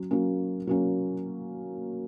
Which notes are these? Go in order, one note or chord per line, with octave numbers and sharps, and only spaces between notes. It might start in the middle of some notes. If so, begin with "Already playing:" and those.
Already playing: F#3 C#4
F#3 A#3 C#4
F#3 A#3 C#4